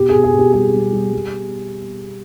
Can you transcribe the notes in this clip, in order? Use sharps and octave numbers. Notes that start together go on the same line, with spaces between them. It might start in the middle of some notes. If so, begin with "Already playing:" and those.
Already playing: B2 G4
G#4
B2
G#4
B2
G4
G3 G#4
G3
G3
G3